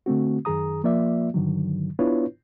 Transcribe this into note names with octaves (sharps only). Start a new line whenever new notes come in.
D3 A3 C4 F#4
F#2 D#3 G#4 A#5 D#6
F3 A#3 F4 D5 E5
G2 D3 D#3 F#3
B3 D4 E4 F4 B4 C#5